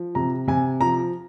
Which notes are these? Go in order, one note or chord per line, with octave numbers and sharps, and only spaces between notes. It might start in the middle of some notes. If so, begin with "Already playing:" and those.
Already playing: F3
C3 A#5
C3 G#5
F3 A#5